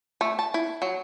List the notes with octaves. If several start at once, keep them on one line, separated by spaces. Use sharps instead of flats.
A3
A5
E4
F#3